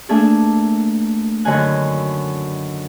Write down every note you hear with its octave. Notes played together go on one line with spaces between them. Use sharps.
A3 A#3 D4 G#4 A4
F#2 D3 D#3 D#5 G#5 F#6